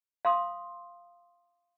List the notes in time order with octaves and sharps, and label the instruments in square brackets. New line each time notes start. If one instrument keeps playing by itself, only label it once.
[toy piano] F5 C6 D#6